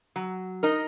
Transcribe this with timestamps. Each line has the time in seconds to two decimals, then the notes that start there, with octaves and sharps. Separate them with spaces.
0.16 F#3
0.63 D#4 A#4 D#5